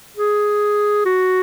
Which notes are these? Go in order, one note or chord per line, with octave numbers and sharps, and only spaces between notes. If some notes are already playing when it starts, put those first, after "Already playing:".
G#4
F#4